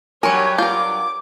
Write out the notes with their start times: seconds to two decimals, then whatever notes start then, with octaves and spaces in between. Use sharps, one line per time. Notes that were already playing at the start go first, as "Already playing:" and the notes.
0.23 G2 F#3 G4 A#4 C#5 G#5 C#6
0.58 F4 A#4 D6 G6